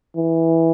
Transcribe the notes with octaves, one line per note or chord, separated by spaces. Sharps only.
E3